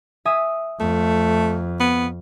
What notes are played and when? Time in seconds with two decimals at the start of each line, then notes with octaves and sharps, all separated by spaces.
0.25 E5 G#5 D#6
0.80 F2 A3
1.80 B3